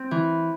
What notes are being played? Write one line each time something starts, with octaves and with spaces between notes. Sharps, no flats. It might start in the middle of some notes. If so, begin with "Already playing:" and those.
Already playing: C4
E3